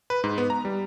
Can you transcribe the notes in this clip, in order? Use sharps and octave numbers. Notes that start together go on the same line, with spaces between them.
B4
G#2
B3
A#5
G3